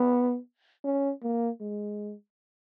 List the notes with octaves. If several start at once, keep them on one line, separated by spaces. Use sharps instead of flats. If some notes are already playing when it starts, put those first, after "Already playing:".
Already playing: B3
C#4
A#3
G#3